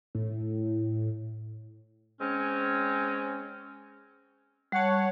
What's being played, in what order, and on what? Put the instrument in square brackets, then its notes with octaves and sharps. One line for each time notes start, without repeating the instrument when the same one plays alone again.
[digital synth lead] A2
[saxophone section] G#3 C4 C#4
[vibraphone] G3 A5 [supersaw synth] C#5 F#5